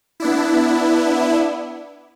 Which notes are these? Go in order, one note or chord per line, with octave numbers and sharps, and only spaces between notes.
B3 D4 E4